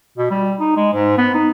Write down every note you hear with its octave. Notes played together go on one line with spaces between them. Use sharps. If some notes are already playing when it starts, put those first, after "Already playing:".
B2
G3
D#4
G#3
G#2
B3
D#4